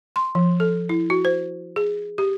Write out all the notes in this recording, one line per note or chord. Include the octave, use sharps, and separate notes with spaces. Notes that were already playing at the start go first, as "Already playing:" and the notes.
C6
F3
A4
E4
F#4
C5
G#4
G4